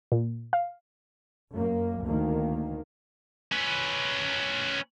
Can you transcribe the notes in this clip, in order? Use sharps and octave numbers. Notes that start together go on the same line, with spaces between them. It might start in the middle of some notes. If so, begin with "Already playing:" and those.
A#2
F5
F#2 A#3
D2 D#3 A#3
C#4 B4